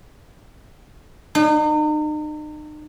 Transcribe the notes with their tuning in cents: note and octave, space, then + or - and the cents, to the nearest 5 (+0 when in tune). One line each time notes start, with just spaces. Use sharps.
D#4 -40